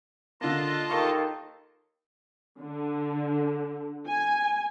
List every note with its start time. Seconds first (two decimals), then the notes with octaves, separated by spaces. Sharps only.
0.41 D3 A#3 F4 D#5 A5
0.90 D#2 D#3 A4 F5 C#6
2.59 D3
4.08 G#5